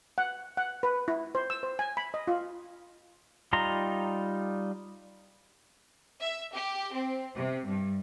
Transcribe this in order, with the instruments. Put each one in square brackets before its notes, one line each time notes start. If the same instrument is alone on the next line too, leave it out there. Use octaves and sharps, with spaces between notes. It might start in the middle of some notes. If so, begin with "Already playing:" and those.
[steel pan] F#5
F#5
B4
E4
C5
E6
C5
G#5
B5
D#5
F4
[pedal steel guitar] G3 D#4 F4 A#5 C6
[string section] E5
G4
C4
C3
G2